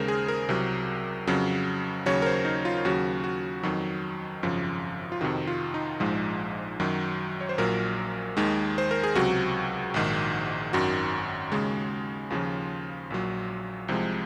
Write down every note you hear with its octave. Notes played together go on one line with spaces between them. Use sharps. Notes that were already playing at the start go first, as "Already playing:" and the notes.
Already playing: D#2 C#3 G#3 A#4 C5
G#4
A#4
C2 C3 F#3
F2 C#3 F#3
D#2 C#3 F#3 C#5
A#4
C5
D#4
F4
D#2 C#3 F#3 F#4
F#4
F2 D#3 F#3
G#1 F#2 C#3 F3
F4
F2 C3 D#3 F#4
F4
D#4
A#1 G#2 F3 G#3
F#2 D#3 F#3
C#5
C5
A#1 A#2 F#3 A#4
D#2 D#3 G#3
C5
A#4
G#4
C#2 C3 F#3 F#4
A#1 G#2 D#3
G#1 F#2 D#3 F#4
D#2 C#3 G#3
D#2 C#3 F3 F4
A#1 A#2 F#3
C2 C3 F3 G#3